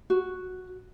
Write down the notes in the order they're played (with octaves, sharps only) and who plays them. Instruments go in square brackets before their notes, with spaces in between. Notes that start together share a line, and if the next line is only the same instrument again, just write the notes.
[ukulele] F#4